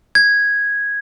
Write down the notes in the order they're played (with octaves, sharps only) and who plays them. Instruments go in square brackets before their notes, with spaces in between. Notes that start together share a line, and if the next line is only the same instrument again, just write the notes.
[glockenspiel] G#6